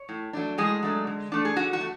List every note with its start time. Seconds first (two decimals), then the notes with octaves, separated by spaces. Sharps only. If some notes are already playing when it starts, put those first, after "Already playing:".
Already playing: C#5
0.09 A2
0.33 F#3 A3 D4
0.58 A2 G#3 G#4
0.83 F#3 A3 D4
1.07 D3
1.32 A3 D4
1.45 G#4
1.56 D3 F#4
1.73 F#4
1.81 A3